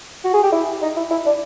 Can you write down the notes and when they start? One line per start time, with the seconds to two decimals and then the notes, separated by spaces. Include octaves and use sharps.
0.24 F#4
0.33 G#4
0.43 G4
0.52 E4
0.82 D#4
0.96 E4
1.11 E4
1.26 D4